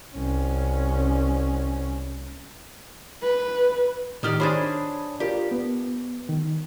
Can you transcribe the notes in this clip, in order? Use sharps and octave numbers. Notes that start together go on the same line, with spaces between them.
C2 C#4
B4
A2 D#3 G4 D5 D#6 F6
D4 G#4 C5 C#5 B5 D#6
F4 G4 A#4 D5
B3
D#3